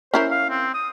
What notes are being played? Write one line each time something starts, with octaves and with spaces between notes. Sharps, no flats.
C#4 E4 A#4 C5
F5
C4
D#6